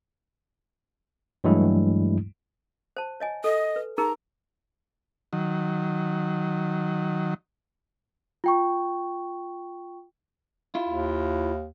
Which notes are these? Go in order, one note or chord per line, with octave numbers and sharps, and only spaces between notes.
G2 E3 F#3 G#3 A3 E4
C5 A5
C#5 D#5 G#5
A4 D#5
B4
D#4 G#4 A#4 A#5
D#3 F#3
F4 G5 C#6
E4 F4
D#2